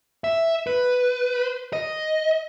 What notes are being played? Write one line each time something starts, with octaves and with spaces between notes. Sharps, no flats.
E5
B4
D#5